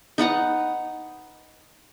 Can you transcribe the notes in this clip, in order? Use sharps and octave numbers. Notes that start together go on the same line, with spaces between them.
D#4 B4 F#5 A#5